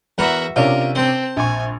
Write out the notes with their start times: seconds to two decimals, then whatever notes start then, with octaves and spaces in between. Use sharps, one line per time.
0.18 E2 F#4 A#4 B4 E5 A#5
0.56 C3 C#4 D4 F4 A#4
0.95 C4 C5 A5
1.37 A#1 G#5 C#6